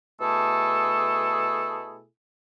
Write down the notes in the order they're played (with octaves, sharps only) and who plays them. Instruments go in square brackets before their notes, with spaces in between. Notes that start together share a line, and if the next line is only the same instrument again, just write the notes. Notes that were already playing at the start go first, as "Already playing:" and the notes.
[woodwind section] B2 A3 E4 G#4 A4